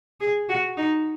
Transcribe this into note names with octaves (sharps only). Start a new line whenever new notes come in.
G#4
F#4
D#4